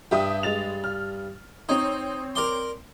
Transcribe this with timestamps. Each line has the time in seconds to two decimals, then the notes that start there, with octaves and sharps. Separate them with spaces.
0.11 G2 G4 E5 D#6
0.43 G#3 A6 F7
0.84 F6
1.69 C4 D#4 C#5
2.35 A#4 D5 C6